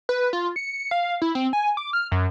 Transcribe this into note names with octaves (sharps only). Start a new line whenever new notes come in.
B4
F4
C#7
F5
E4
C4
G#5
D6
F6
F#2